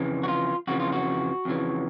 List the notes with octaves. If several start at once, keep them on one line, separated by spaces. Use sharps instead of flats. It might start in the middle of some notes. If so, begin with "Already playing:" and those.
Already playing: F2 C#3 E3
F#4
F4
F2 C#3 E3 F#4
F4
F#4
F2 C#3 E3